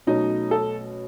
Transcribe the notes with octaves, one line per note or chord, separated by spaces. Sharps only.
B2 F#3 A3 C#4 D#4
A4